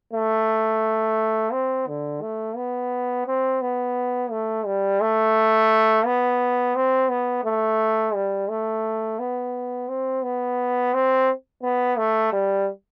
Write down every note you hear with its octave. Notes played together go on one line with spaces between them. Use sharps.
A3
C4
D3
A3
B3
C4
B3
A3
G3
A3
B3
C4
B3
A3
G3
A3
B3
C4
B3
C4
B3
A3
G3